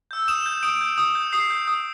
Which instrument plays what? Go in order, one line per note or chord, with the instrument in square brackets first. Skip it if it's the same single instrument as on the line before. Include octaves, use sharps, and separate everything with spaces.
[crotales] E6 G6
D#6 E7
G6
D#6 D7
G6
D#6
G6
D#6 C7
G6
D#6